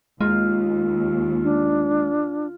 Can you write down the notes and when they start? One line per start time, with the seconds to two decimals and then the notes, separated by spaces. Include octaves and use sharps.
0.21 D#2 G#3 F4
1.43 D4